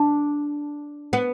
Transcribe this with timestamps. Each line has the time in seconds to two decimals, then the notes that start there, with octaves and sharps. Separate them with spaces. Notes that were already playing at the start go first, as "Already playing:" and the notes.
Already playing: D4
1.13 B3